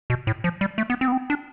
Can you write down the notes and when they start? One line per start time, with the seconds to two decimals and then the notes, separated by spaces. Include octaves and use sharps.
0.10 B2
0.27 A2
0.44 F3
0.61 G3
0.78 A3
0.90 B3
1.01 C4
1.08 B3
1.12 C4
1.30 D4